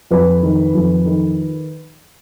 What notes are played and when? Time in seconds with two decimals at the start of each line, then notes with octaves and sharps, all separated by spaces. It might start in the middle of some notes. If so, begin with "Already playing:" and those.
0.11 F2 B4
0.43 D#3
0.74 F2
1.06 D#3